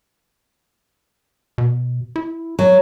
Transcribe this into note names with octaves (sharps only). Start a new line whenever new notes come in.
B2
E4
F#3